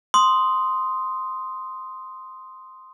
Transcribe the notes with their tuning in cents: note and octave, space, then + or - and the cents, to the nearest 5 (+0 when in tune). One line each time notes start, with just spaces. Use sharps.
C6 -5 D#6 +0